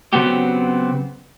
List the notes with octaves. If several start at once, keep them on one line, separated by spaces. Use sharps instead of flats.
C#3 F#3 B3 C4 F#4 G4